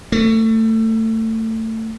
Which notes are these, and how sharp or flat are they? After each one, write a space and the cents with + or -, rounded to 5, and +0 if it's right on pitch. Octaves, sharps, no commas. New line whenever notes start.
A3 +25